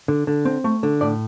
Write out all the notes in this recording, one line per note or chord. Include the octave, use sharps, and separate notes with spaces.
D3
D3
C4
A3
D3
A2 D5